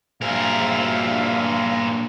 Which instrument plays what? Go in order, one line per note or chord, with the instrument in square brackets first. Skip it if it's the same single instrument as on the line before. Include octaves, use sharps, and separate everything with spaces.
[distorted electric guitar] G2 A#4 [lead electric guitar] A#2 G#4 [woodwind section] F3 E5 F5